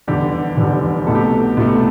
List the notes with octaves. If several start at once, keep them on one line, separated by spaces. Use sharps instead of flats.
F1 E2 D3 G3 G4
F1 E2 D3 G3
C2 B2 A3 A4
G4
A4
C2 B2 A3